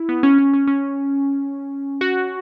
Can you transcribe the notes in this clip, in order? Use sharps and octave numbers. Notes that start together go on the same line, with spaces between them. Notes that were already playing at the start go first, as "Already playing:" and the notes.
Already playing: E4
B3
C#4
C#4
C#4
C#4
F#4